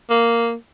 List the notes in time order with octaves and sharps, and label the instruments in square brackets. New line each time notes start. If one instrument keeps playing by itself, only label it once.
[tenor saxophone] A#3